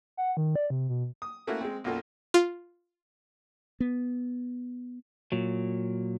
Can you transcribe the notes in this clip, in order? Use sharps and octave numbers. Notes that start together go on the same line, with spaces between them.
F#5
D#3
D5
C3
B2
D#6
A3 A#3 C#4 E4 F#4 A#4
G#3 C4
B1 F#2 A#3 F4 A4
F4
B3
A#2 F#3